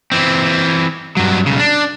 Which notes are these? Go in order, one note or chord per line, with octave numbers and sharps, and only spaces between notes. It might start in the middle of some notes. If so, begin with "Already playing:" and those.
E3 C4
G2 F#3
B1 C#3
D4